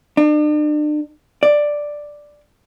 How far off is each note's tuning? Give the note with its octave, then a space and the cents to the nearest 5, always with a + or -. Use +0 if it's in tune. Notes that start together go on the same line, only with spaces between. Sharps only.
D4 +40
D5 +5